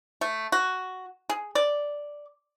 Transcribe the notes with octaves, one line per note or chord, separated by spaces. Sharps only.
A3
F#4
G#4
D5